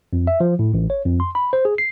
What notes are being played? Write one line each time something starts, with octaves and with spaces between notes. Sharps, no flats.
F2
E5
F3
A2
A1
C#5
F2
C6
B5
C5
G#4
C7